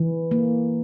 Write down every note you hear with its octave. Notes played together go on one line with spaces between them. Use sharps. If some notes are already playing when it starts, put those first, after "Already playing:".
Already playing: E3
A#3